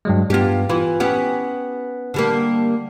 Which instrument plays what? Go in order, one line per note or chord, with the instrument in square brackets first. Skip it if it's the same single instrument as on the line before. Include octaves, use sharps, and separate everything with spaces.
[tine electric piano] G2 F#3 G#3
[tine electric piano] G2 B3 [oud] F4 G4
[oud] E3 [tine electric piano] F4
[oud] B3 C#4 G4 [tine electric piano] F#5
[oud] D3 G3 A#3